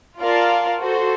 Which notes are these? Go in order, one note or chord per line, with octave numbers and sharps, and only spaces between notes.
F4 A#4 D5 F5 A5
F#4 A4 C5